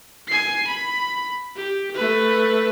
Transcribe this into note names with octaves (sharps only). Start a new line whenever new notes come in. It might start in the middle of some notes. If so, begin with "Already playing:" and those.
G#5 C7
B5
G4
A3 B4